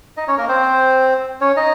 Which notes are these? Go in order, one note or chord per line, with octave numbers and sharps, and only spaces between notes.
D#4 D#5
C#4 C#5
A#3 A#4
C4 C5
C#4 C#5
D#4 D#5